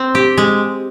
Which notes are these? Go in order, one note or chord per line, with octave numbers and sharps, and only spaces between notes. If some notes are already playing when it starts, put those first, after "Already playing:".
Already playing: C4
G4
G#3